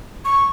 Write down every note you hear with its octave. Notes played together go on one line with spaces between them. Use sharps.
C#6